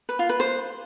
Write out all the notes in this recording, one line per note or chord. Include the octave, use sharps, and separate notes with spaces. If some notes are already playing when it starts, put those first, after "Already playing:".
B4
F4
B4
C5